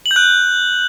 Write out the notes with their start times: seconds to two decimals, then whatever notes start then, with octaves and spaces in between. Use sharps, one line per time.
0.06 F#7
0.11 G6
0.16 F#6